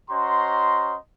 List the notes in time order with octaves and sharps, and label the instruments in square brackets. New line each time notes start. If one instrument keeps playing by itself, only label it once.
[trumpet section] C#4 F#4 C5 D#5 A#5 C6